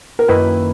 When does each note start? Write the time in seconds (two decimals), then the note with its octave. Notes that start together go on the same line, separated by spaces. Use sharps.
0.19 A#4
0.28 F#2 D#3 A#3 E4 B4